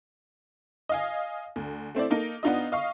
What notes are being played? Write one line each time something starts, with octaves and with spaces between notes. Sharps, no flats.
D#5 F5 G#5
D2
A3 C4 E4 D5
A#3 D#4 A4
B3 D4 D#4 F4 D#5
D#5 F5 C#6